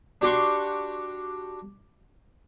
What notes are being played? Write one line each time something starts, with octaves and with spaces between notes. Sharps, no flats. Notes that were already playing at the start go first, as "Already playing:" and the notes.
D4 F#4 G4 G5 C6 C#6